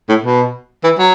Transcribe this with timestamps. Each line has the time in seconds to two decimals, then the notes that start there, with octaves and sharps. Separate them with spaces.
0.09 A2
0.24 B2
0.84 E3
0.98 F#3